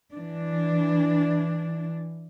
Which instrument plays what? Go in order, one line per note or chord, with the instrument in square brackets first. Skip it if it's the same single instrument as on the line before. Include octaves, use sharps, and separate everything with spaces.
[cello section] E3 D4